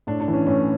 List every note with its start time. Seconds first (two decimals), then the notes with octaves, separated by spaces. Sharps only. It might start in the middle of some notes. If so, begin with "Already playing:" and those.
0.07 A2 D4
0.21 D4
0.28 E3
0.33 C#4
0.47 A2 C#4